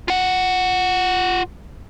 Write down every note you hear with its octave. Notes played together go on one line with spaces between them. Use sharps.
F4 F#5